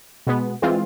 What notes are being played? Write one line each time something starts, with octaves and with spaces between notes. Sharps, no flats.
B2 G#3 B3
E3 G#3 C4 F4